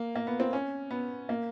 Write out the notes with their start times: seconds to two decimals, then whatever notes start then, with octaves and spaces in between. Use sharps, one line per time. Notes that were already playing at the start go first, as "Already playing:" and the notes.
Already playing: A#3
0.15 A#3
0.27 B3
0.40 C4
0.53 C#4
0.91 B3
1.29 A#3